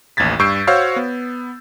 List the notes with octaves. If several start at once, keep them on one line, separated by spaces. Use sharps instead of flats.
A1 D#2 G#6 A6 B6
G2 C#6 E6 G6 C7 D7
F#4 C5 C#5 F5 C#6 E6
B3